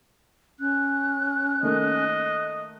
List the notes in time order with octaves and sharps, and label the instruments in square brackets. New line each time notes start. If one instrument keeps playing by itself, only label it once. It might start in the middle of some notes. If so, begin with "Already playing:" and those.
[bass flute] C#4 [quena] F#6
[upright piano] D#3 A3 A#3 [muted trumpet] D#5